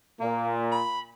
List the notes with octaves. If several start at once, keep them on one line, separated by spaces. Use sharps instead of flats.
A#2 A#3
B5